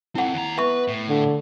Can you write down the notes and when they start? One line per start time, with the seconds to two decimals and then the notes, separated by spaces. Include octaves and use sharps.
0.15 C4 E4 A4 F#5
0.33 D#2 A#5
0.58 B3 B4 E5 C#6
0.88 A2
1.09 D3